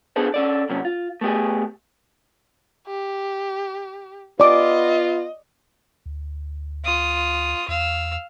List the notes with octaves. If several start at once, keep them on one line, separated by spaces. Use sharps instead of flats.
B3 D4 G#4 A4 B4 C5
C#4 A4 D5
C3 F#3 A#3 C#4
F4
A3 B3 G4 G#4
G4
B3 F4 D5 D#5 D6
D2
F4 D#6
E2 F5 E6